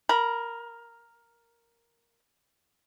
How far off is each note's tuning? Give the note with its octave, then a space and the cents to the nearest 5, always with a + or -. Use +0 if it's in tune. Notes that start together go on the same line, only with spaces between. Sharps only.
A#4 +0 B5 -25